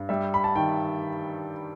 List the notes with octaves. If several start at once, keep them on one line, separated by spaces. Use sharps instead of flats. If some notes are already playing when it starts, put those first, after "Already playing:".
Already playing: G2
G3 E5
B5
A5
D#3 G5